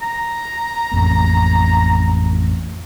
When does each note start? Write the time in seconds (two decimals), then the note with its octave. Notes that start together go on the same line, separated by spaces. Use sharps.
0.02 A#5
0.91 A1 F2 A#3